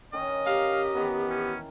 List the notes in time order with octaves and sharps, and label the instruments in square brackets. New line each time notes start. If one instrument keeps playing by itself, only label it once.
[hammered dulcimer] D#3 C#4 [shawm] D#5
[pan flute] G4 [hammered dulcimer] A#4 [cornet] F5
[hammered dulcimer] D#3 E3 [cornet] B3
[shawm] C#4